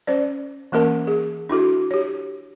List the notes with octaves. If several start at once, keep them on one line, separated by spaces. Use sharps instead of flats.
C#4 C5 D5
E3 A#3 C#4 A#4 A5
G#4
D4 E4 F#4 A4
G4 C#5